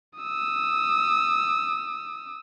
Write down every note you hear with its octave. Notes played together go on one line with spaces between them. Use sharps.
D#6 E6